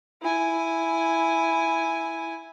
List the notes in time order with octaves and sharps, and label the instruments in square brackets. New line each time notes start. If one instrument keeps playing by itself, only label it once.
[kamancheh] E4 G#5